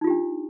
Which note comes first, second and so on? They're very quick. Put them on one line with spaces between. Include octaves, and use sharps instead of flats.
D#4 F4 G4 D4